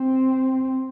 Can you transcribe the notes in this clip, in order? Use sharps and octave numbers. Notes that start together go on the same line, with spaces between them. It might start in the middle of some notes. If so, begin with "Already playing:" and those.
Already playing: C4